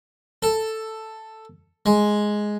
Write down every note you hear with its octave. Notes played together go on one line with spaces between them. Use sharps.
A4
G#3